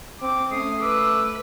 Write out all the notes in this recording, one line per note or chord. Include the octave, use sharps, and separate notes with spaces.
C4 D6
A3 C#4 D#6 C7
B4 D6 E6